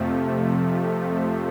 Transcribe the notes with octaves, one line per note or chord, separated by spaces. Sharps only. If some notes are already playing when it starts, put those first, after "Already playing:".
Already playing: F2 C3 F3 A3